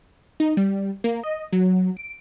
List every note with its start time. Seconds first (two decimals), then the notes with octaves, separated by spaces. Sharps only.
0.40 D#4
0.57 G3
1.04 A#3
1.24 D#5
1.53 F#3
1.97 D7